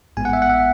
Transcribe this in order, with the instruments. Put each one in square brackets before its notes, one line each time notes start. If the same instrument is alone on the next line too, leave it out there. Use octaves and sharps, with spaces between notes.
[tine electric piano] A1 G#2 G#3 B3 G#5
F#5
E5
F#5
E5